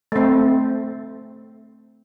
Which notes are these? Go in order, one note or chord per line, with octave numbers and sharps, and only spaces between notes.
A3 C4